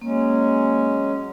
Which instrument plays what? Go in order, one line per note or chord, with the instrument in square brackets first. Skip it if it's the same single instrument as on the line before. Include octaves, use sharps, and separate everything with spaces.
[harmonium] F#3 G#3 C#4 [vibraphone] A#3